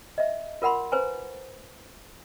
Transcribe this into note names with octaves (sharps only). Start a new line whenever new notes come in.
D#5 E5
F4 A#4 F#5 B5 C6
B4 C5 G#5 A#5